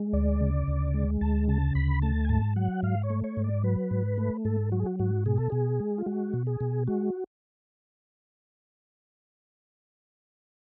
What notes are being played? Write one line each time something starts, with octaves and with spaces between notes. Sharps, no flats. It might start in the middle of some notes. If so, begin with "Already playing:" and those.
Already playing: G#3
D2 D5
C#3
D2
G#3
D2 A5
C#3 A5
D2 B5
A3 A5
G#5
G#2 A5
F#3 F#5
G#2 F5
C#5
A3
C#5
G#2
D5
F#3 B4
G#2
A3
G#2 A4
F#3 F#4
G#4
F#4
G#2 F#4
B2 G#4
A4
B2 G#4
G#3
F4
G#3 F#4
B2
G#4
B2
G#3 F#4